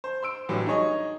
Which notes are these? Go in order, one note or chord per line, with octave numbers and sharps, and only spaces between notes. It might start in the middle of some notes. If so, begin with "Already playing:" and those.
C5
C6 E6 D7
A2 D3 E3 F#3 G3
D#4 G#4 C#5 D#5